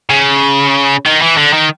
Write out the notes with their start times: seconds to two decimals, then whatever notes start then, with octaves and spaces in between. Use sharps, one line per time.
0.10 C#3
1.06 D#3
1.22 E3
1.38 D3
1.54 D#3